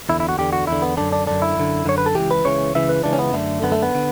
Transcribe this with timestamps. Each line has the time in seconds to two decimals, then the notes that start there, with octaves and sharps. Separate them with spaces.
0.09 E2 D3 E4
0.20 E4
0.29 F#4
0.38 E2 D3 G4
0.53 F#4
0.67 E2 D3 E4
0.82 B3
0.97 F#2 D3 D4
1.12 D4
1.27 F#2 D3 D4
1.42 E4
1.57 F#2 D3
1.86 F#2 D3 C#5
1.98 B4
2.06 A4
2.15 C#2 C#3 E3 G4
2.31 B4
2.45 C#2 C#3 E3 C#5
2.74 C#2 C#3 E3 E5
2.89 B4
3.03 C#2 C#3 E3 D4
3.13 C#4
3.19 B3
3.33 F#2 D3 A3
3.62 F#2 D3 B3
3.72 A3
3.83 B3
3.95 D3